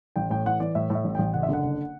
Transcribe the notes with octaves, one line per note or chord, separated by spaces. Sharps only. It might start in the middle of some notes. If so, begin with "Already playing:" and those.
A1 G5
A2 G5
E3 F#5
E3 D5
A2 E5
A2
E5
A1
A1 G5
F#1 F#5
E5
D3 F#5
F#1